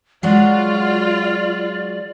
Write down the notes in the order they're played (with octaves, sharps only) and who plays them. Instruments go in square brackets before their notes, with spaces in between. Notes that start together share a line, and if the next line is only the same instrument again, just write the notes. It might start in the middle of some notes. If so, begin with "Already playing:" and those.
[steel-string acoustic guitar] F#3 G#3 F#4 [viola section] F4 [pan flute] D5